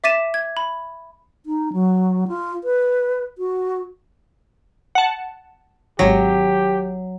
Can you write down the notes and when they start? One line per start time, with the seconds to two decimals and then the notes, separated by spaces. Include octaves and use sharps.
0.04 E5 D6 A6 B6 D#7 E7
0.34 G#6
0.57 B5
1.46 D#4
1.73 F#3
2.28 F4
2.64 B4
3.38 F#4
4.95 F#5 A5
5.99 G#1 F#3 G4 A#6